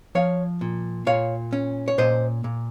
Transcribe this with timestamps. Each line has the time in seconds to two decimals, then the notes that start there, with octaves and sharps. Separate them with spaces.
0.15 F3 C#5 F5
0.61 A#2
1.07 A#2 C#5 F5
1.53 C#4
1.88 C#5
1.98 A#2 C5 D#5
2.44 A#2